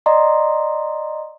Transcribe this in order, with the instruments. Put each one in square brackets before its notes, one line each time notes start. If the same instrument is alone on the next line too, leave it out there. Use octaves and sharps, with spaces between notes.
[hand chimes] D5 D#5 A#5 C6